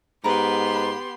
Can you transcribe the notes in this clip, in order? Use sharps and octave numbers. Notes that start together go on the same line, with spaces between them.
G#2 B3 G4 A#4 B4 C6